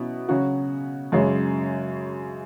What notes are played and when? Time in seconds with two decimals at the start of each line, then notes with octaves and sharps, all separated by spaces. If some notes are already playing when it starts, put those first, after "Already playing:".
Already playing: B2 F#3 C#4 E4
0.28 C#3 F#3 C#4 F#4
1.12 F#2 C#3 G#3